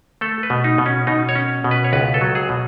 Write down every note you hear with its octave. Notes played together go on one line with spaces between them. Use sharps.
A3 A4
B4
B2
D#4
B2
C#4
B2 D#4
C#5
C#4
B2
B4
C#5
C#2 B4
A4
F#3
G#4
B2